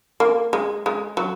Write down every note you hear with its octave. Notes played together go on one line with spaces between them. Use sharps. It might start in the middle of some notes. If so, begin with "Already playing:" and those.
A#3
G#3
G#3
F#3